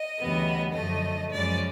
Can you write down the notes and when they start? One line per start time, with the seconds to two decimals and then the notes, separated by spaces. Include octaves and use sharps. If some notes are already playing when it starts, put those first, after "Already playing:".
Already playing: D#5
0.18 D2 C#3 E3 G3 B3
0.73 F#2 D3 F3 A3 D#5
1.30 F#2 C#3 F3 G#3 C#4 D5